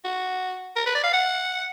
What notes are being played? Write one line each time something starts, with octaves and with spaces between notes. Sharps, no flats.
F#4
A#4
B4
D5
F5
F#5